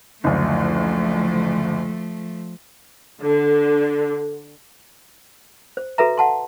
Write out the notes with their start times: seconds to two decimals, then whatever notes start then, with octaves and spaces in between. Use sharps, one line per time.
0.24 F#1 D2 F3 A3
3.23 D3
5.77 C5
5.98 F#4 A4 B4 E5 A#5
6.18 F#5 A5 C6